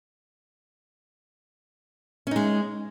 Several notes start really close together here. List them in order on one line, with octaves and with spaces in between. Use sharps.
C#4 D#4 G#3